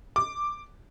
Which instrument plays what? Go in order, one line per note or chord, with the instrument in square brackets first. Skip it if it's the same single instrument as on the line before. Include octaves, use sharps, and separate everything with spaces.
[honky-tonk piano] D6